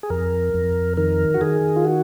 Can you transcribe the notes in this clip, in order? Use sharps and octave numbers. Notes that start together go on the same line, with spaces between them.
G#4
F2 A#4
F2
D#3 A#4
F#4
D#3 G#4
F4
F#4